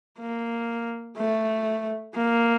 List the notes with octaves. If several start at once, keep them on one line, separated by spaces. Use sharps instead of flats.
A#3
A3
A#3